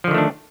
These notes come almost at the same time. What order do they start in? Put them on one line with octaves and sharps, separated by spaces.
F3 D3 D#3 A3 D4